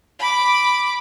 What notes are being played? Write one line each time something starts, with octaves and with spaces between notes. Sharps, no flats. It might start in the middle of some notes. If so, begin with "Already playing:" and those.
B5 D6